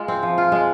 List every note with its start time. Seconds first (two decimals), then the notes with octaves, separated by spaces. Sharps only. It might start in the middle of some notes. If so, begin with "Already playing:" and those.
Already playing: G#3 F4
0.08 C4
0.23 F3
0.38 F4
0.52 G#3